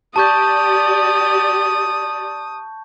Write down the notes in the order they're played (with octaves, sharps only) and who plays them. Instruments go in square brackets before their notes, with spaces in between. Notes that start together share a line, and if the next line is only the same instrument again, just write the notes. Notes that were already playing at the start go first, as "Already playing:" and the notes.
[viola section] G4 D5 [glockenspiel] A5 C#6 G6 [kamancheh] D#6